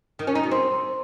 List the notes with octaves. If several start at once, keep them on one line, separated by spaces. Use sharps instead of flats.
D#3
C#4
D#4
B2
C4